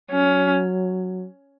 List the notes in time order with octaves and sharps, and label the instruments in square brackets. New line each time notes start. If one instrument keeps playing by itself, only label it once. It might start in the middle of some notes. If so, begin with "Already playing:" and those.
[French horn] F#3 [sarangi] C#4